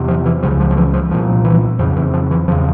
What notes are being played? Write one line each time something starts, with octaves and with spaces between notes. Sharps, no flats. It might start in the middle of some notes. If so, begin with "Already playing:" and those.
Already playing: E2 C3
F3
E3
C#2 C#3 F3
F3
F3
E3
F3
C2 A#2 F3
E3
F2 C#3 F3
E3
F3
E3
E2 C#3 F3